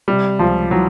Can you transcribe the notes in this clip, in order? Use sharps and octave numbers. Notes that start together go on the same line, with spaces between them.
C3 G3
C#2 F3
E3 F#3